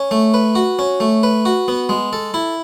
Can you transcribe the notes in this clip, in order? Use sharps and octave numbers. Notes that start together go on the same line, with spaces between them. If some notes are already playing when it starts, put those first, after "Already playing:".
Already playing: C#4
A3
B4
F#4
C#4
A3
B4
F#4
B3
G#3
A4
E4